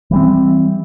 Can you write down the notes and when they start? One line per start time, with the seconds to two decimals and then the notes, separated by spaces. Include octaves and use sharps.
0.11 E3
0.13 G3
0.16 C4